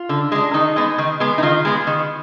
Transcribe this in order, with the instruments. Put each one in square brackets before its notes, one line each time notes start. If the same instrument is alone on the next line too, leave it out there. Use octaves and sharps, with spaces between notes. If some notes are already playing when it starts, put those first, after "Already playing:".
Already playing: [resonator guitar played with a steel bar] F4
D3
G#3 D4
D#3 D#4
G#3 B3
D#3
G#3 B3
D#4
D#3 F4
G#3 B3
D#3